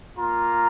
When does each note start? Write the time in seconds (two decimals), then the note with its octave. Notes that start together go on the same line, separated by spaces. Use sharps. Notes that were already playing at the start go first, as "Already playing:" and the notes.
0.18 A#3 F4 A#5